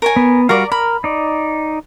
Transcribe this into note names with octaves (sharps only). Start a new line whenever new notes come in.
A#4 C#5 G#5
B3
G3 F#4 A#4 D5 F5
A#4 B5
D#4 D5